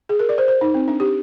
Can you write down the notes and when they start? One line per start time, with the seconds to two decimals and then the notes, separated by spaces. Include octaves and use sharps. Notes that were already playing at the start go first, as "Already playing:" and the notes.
0.09 G#4
0.19 A#4
0.29 D5
0.38 C5
0.48 C5
0.61 D#4
0.74 C4
0.88 D4
1.00 G4